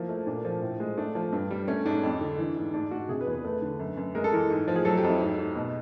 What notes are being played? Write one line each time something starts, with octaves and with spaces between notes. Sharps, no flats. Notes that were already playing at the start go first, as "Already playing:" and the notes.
Already playing: F3 A#3 E4
A3
A#2 D4
F3
A2
G#3
A3 D4
F3
G2
G3
A3 C#4
G#2 D4
F2
D3
E3
G#2
G#2 D4
G#2 F#4
C3 G#4
B4
E2
B4
A3 B4
D3
F#2
F#2
G#3 A#4
A4
E3 A#4
G#2
F3
G#4
F#3 A4
G4
F2
E4
G#2
G#2
B2